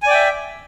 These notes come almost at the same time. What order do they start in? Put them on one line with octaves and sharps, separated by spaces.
G#5 D5 G5 E5